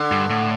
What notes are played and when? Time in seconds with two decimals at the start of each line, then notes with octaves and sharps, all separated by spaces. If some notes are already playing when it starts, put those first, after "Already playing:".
Already playing: D3
0.12 G2
0.30 A2